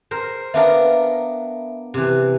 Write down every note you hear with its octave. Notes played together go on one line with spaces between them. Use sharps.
A#4 C5
B3 D4 A#4 E5 F5
C3 E3